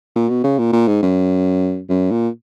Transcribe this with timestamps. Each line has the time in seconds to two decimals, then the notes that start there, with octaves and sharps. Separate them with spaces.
0.15 A#2
0.29 B2
0.44 C#3
0.59 A#2
0.73 A#2
0.88 G#2
1.03 F#2
1.90 F#2
2.11 A#2